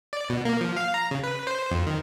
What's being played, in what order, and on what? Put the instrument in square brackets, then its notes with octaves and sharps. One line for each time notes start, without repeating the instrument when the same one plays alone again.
[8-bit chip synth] D5
B2
A#3
F3
F5
A#5
C#3
B4
C5
F2
D#3